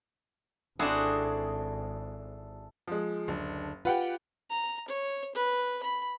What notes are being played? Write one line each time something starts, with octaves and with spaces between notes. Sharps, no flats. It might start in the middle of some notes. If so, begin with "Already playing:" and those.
G#1 C4 D4 E4 F#4 G#4 A4
F3 G#3
F#1 D2 D4
F4 G4 B4 F#5 G5
A#5
C#5
B4
B5